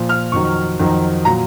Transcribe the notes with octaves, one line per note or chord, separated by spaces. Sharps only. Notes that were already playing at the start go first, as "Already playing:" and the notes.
Already playing: A#2 F3
F6
F2 D#3 F#3 C#6
F2 D#3 F#3
A#2 F#3 A#5